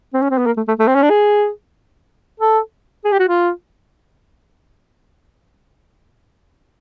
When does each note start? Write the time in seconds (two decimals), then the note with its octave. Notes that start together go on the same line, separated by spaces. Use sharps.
0.14 C4
0.22 C#4
0.31 C4
0.38 B3
0.46 A#3
0.57 A3
0.68 A3
0.79 A3
0.87 C4
0.95 C#4
1.02 D4
1.10 G#4
2.40 A4
3.05 G#4
3.12 G4
3.20 F#4
3.28 F4